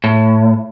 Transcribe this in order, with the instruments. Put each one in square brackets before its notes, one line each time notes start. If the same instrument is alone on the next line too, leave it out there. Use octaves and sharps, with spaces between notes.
[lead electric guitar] A2